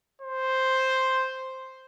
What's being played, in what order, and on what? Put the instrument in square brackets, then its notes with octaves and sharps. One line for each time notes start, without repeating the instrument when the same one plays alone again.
[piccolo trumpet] C5